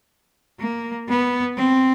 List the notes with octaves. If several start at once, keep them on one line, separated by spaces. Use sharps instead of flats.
A#3
B3
C4